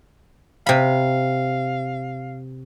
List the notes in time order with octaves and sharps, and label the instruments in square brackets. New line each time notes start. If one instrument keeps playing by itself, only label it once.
[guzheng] C3 B5 [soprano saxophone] F5